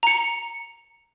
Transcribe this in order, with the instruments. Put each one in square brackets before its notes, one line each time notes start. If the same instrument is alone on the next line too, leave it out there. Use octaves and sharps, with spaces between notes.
[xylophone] A#5 C#7